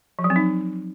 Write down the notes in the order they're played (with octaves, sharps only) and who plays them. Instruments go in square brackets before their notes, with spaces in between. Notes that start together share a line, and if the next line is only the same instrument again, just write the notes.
[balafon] F3
F#3
C4
D#4